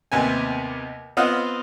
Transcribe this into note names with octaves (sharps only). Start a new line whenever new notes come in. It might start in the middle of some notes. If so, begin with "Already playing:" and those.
D#2 C3 B3 G#5
B3 C4 F4 D#5 F5 F#5